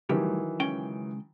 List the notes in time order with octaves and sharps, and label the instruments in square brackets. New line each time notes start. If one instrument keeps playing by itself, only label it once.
[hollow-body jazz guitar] A2 G3 G4 [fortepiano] D#3 E3 F#3
[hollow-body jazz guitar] C#2 C#4 G5